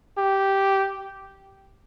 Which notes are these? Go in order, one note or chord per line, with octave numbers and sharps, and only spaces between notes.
G4